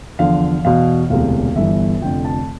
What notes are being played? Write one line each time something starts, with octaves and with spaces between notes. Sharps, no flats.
E2 D3 F3 F5
E2 B2 F5
E1 D2 C3 E3 F5
G1 G2 E3 E5
F1 F2 D3 F3 G5
A5